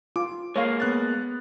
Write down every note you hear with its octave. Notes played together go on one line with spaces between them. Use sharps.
F4 D6
G#3 A#3 C#5 F5
B3 F#6 A6